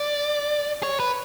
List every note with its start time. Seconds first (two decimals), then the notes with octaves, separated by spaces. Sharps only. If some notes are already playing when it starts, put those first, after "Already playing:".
Already playing: D5
0.83 C#5
1.00 B4